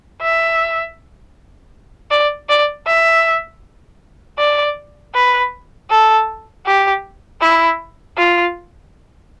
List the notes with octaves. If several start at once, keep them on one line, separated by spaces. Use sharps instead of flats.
E5
D5
D5
E5
D5
B4
A4
G4
E4
F4